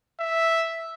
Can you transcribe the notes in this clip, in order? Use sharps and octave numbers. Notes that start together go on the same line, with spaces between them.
E5